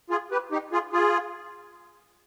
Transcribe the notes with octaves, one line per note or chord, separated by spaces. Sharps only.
F4 G#4
G4 B4
D#4 G4
F4 G#4
F4 G#4